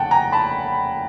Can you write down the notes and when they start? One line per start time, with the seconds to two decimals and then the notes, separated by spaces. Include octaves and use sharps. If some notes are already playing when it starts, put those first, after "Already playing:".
Already playing: F1 D#2 C#3 F#5 G5 A5
0.11 G#5 A#5
0.32 A5 B5